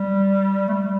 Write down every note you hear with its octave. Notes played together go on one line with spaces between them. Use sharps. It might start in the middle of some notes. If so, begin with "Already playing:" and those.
Already playing: G3
A3
G3